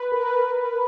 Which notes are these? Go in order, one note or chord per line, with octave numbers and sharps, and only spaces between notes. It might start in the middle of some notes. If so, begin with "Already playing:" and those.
Already playing: B4
A#4
B4